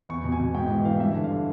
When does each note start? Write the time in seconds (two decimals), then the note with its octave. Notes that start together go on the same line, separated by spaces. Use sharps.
0.09 E2 C#6
0.24 B2
0.32 G#5
0.40 B2
0.54 G#2 G5
0.70 E3
0.85 E3 F5
1.00 G2 E5
1.13 D3 E5
1.24 F5
1.31 D3